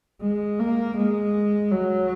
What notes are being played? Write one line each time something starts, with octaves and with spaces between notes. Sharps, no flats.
G#3
A#3
G#3
F#3